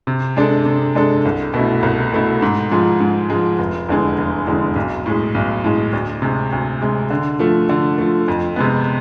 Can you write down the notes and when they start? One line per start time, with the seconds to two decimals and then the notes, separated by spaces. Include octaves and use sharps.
0.07 C3
0.36 G#3 D4 A4
0.65 C3
0.95 G#3 D4 A4
1.25 C2
1.54 B2 A3 E4
1.83 C2
2.12 B2 A3 E4
2.42 G#2
2.71 F3 G#3
3.00 G#2
3.30 F3 G#3
3.58 F1
3.89 E2 D3 G#3
4.18 F1
4.47 E2 D3 G#3
4.76 B1
5.06 A2 G#3
5.34 B1
5.64 A2 G#3
5.93 D2
6.22 C3 G#3
6.52 D2
6.82 C3 G#3
7.10 D3
7.39 F3 A3
7.69 D3
7.98 F3 A3
8.28 F2
8.56 C3 G#3 B3